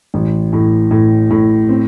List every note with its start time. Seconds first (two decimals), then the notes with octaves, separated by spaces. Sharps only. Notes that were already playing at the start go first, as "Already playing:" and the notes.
0.14 A1
0.53 A2
0.91 A2
1.30 A2
1.69 C4